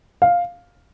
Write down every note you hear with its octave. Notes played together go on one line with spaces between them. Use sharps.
F5